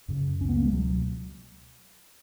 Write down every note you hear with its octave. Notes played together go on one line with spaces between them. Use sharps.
F#2 C#3
C#2 C#3 C#4
B3
A#3
G#3
C#2 B2 F#3